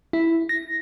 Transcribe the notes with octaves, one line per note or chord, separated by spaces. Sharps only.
E4
A#6